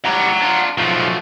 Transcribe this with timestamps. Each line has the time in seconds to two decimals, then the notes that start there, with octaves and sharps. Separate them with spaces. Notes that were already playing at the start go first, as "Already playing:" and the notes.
0.05 A2 G3 F#5 A#5
0.42 D4 F4
0.78 B1 F3 F#3 A3